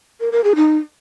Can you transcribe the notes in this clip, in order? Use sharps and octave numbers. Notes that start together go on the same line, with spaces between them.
A#4
A#4
G#4
D#4